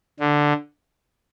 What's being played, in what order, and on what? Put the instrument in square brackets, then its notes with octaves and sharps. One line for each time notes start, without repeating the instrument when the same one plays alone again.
[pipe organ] D3